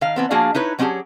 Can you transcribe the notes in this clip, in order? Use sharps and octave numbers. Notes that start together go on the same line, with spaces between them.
D#3 F5
E3 B3 C4
F3 A#3 D4 F#4 G#4 F5
D#4 E4 B4 C#5
F#3 C4 C#4 D#4 G4 G#4